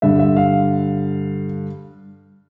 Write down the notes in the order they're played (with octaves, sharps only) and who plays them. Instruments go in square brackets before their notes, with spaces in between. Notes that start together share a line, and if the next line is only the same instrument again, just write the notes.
[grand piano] G2 D3 E5
E5
F5